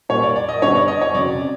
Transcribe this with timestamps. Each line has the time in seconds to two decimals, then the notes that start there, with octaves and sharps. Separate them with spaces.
0.09 A#2 G3 A#3 C#5
0.23 D5
0.36 D5
0.49 D#5
0.62 G2 D3 G3 B3 C#5
0.75 D5
0.88 D#5
1.01 C#5
1.14 F2 C#3 F#3 D5